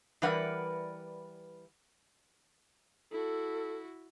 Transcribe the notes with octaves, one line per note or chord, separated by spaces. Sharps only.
E3 G3 A#4 B4 D5 F#5
E4 F#4 A4